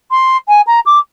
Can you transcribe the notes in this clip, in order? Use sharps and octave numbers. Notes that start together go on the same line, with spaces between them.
C6
G#5
A#5
D6